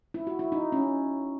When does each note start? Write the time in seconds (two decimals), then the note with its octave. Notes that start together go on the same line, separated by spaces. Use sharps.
0.14 E4
0.27 F#4
0.39 E4
0.52 D#4
0.72 C#4